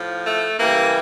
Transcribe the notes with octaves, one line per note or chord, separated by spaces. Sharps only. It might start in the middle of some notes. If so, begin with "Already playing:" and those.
Already playing: A2 F3
A3
C#3 E3 G3 A#3